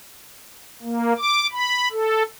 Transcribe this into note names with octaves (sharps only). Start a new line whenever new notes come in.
A#3
D6
B5
A4